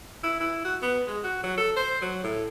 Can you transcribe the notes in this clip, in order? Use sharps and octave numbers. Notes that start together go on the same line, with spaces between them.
E4
E4
F#4
B3
G#3
F#4
F#3
A4
C5
F#3
A2